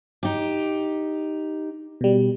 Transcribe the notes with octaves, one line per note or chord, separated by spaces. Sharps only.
D#4 G4
B2 G3